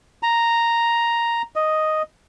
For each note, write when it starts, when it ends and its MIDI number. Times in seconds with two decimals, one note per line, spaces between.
0.23 1.42 82
1.56 2.02 75